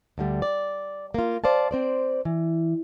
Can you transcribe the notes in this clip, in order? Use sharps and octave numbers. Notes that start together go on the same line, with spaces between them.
D2 D3 G3
D5
A#3 F4
C5 D5 F5 A5
C4 C5 D5
E3